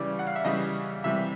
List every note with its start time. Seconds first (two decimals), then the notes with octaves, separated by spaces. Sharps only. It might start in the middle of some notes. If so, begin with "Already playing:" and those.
Already playing: C#3 E3 G3 D5
0.19 F#5
0.27 F5
0.36 E5
0.45 C#3 E3 G3 D#5
1.04 C3 E3 G3 E5